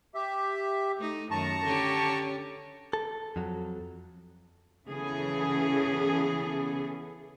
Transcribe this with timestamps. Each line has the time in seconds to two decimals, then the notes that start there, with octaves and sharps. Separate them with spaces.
0.15 G4 E5
0.97 A3 D#4
1.31 F#2 D#3 A5 A#5 C#6
1.64 D3 C#4 G4
2.93 A4
3.36 F2 F#3
4.87 C#3 E3 B3 C#4 G#4 A4